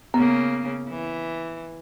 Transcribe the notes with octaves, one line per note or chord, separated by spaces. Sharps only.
C#3 A#3 B3
E3